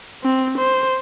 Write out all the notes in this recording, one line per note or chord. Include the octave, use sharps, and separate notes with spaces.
C4
C5